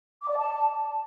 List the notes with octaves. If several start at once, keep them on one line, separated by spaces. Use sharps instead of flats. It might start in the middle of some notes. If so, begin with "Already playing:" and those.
D6
D5
A5